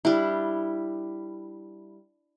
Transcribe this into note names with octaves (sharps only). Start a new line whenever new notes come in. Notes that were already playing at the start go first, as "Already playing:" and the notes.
G3 D4 E4